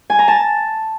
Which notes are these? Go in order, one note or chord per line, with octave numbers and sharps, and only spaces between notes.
G#5
A#5
A5